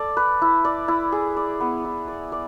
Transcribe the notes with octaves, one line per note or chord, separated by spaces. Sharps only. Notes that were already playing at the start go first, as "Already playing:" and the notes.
Already playing: A4 D5
B4
E4
D5
E4
G#4
D5
B3
E4
D5
D5